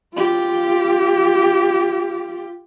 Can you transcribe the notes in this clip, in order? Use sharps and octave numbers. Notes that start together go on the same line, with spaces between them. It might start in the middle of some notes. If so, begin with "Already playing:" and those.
F4 G4